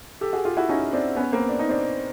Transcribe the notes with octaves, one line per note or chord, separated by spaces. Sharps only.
G4 A4
F#4 G#4
F4 G4
E4 F#4
C#4 D#4
C4 D4
B3 C#4
A#3 C4
D4
D#4
C4 D4